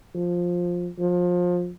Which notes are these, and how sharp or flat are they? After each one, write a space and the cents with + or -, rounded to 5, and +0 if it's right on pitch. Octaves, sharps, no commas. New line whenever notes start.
F3 +10
F3 +25